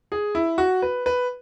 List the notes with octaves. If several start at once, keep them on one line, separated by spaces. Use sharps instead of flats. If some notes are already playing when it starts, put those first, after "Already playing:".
G#4
E4
F#4
B4
B4